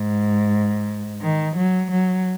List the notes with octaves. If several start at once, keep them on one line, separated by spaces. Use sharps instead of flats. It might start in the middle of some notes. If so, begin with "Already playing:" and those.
Already playing: G#2
D#3
F#3
F#3